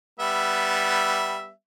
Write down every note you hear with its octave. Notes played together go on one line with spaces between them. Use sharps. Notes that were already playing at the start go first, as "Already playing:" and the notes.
G3 B3 E5